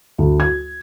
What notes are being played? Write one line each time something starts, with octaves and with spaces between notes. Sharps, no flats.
D2
G#6